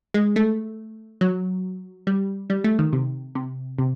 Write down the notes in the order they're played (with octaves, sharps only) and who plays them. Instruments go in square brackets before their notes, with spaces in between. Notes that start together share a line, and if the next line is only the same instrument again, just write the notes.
[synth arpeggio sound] G#3
A3
F#3
G3
G3
A3
D#3
C3
C3
C3